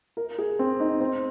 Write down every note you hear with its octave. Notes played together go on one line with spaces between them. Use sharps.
A#4
G#4
C4
D#4
C4